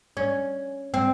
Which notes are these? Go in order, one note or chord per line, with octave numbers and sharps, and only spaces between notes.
C#4
C4